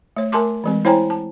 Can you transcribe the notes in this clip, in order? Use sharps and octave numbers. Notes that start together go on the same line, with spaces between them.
A3 C#5
A3 A#4 G#5 A5 C6 D6
E3 G#3 C4
E4 C5 C#5 G5 G#5 A#5
A5